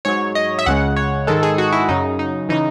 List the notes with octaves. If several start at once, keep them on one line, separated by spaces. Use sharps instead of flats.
G#2 F#3 C#5
D#5
E5
C#2 C#3 G#3 F#5
C#5
G#2 D#3 G#3 A4
G#4
F#4
E4
F#2 C#3 F#3 D#4
D#4
C#3 E3 D#4